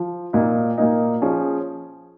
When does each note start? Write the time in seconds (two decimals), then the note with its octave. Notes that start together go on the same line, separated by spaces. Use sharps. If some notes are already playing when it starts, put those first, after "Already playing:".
Already playing: F3
0.33 A#2 A#3 D#4
0.78 A#2 A#3 D#4
1.22 F3 C#4 G#4